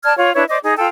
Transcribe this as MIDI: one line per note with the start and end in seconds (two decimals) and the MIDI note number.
0.04 0.13 74
0.04 0.13 81
0.04 0.13 89
0.04 0.13 92
0.17 0.32 65
0.17 0.32 73
0.35 0.45 62
0.35 0.45 64
0.35 0.45 71
0.35 0.45 73
0.49 0.58 72
0.49 0.58 74
0.49 0.58 75
0.49 0.58 86
0.63 0.74 63
0.63 0.74 68
0.63 0.74 75
0.77 0.87 65
0.77 0.87 69
0.77 0.87 79